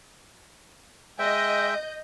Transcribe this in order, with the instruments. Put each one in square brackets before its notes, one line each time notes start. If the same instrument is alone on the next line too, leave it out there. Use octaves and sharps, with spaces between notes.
[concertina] G#3 E5 G5 [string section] D#5 G6